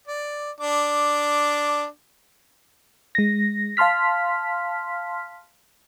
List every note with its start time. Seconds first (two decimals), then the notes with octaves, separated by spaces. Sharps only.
0.08 D5
0.60 D4 D6
3.15 G#3 A#6
3.77 F5 A5 C6 F6 B6